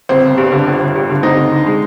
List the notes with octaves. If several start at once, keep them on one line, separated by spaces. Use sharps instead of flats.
G1 C4
G1
G2
D3
G1
G1
G2
D3
D2 C4 D#4
D2
D3
G#3